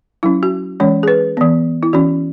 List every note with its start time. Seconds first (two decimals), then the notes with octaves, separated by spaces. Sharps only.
0.23 F#3 C#4 E4
0.43 F#4
0.80 E3 G#3 C#4 C#5
1.03 G#4
1.08 B4
1.37 E3 B3
1.83 E4
1.93 E3 C#4 F#4